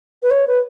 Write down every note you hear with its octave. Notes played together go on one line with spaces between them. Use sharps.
B4
C#5
B4